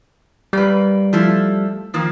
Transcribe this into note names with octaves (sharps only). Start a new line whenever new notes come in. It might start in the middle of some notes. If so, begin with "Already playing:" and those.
G3 A#3 B4
F3 A3 E4
D#3 F3 A#3